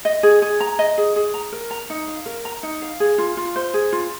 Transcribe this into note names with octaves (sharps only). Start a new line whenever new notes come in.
D#5
G#4
G#4
A#5
D#5
G#4
G#4
A#5
A#4
A#5
D#4
F5
A#4
A#5
D#4
F5
G#4
F4
F4
C5
G#4
F4